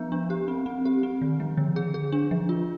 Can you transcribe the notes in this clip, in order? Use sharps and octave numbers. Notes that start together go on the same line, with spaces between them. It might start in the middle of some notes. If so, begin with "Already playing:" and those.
Already playing: F3 B3
D4
G4
C4
C4
G4
C4
D#3
F3
D3
G#4
G#4
D4
F3
F4